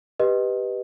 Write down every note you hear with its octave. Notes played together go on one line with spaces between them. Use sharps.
G4 B4 D#5